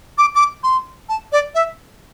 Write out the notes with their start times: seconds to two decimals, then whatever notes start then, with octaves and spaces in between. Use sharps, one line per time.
0.18 D6
0.35 D6
0.63 C6
1.09 A5
1.32 D5
1.55 E5